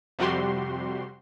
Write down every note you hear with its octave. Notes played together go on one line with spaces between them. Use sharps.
F2 C3 G3 F#4 G4 C6